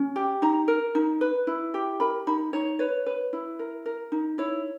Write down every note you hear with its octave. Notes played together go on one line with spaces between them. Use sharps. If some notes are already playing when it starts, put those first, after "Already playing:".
Already playing: C#4
G4
D#4 A#5
A#4
D#4
B4
E4
G4
A#4 B5
D#4 B5
D#4 C#5
B4 C#5
B4
E4
A#4
A#4
D#4
E4 C#5